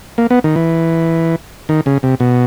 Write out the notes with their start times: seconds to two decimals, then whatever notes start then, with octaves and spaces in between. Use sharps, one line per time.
0.18 A#3
0.30 B3
0.44 D#3
0.56 E3
1.69 D#3
1.86 C#3
2.03 C3
2.20 B2